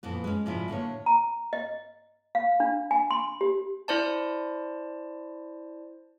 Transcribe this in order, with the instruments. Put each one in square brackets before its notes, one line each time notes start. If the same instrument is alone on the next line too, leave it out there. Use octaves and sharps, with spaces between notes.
[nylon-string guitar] F2 A#2 E3 B3
G#3 C#4
G#2 C3 F3 G3 E4
A2 D3 A#3 C#5
[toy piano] A#5
D#5
F5
D4
G#5
C6
G4
[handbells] E4 C5 D5 A5